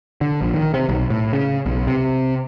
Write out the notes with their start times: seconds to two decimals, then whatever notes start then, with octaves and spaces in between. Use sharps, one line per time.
0.21 D3
0.41 A#1
0.54 D#3
0.74 C3
0.89 B1
1.10 A2
1.33 C#3
1.66 B1
1.87 C3